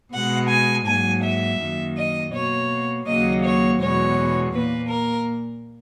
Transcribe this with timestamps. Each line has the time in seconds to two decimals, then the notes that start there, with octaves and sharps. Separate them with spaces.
0.13 B2 G#3 F#5
0.49 G#5
0.86 G#2 F#3 A#3 G#5
1.24 E5
1.60 F#2 D#3 A#3
1.97 D#5
2.33 B2 A#3 C#5
3.07 D#2 C#3 F#3 A#3 D#5
3.44 C#5
3.81 E2 B2 G#3 C#5
4.54 A#2 A#3 B4
4.90 A#4